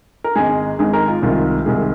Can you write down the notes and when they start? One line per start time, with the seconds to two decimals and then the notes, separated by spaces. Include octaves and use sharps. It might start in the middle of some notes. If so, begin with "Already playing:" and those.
0.24 A#4
0.35 G#1 G#2 G#3 G#4
0.79 G#1 G#2 G#3 G#4
0.93 A#4
1.08 F4
1.22 C2 C3 D#3 G#3 F4
1.66 C2 C3 D#3 G#3 G#4